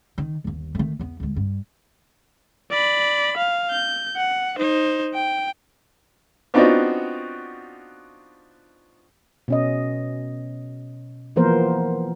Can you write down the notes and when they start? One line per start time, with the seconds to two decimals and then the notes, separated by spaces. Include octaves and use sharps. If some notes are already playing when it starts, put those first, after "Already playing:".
0.18 D#3
0.44 G1 D#2
0.75 D#3 A3
0.99 E2 B3
1.20 D2 G#3
1.36 G2
2.71 D5 B5
3.37 F5
3.71 G6
4.17 F#5
4.58 D#4 C5
5.14 G5
6.54 B3 C4 D4 D#4 F4 F#4
9.48 B2 C#4 D#5
11.36 E3 F3 A#3 B3 A#4 C5